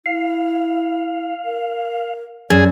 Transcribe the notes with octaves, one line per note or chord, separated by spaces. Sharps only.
E4 F5
A#4
F#2 G#4 D5